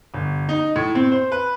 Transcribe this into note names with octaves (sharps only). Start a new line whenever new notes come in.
G1
D#4
A2
C4
C5
B4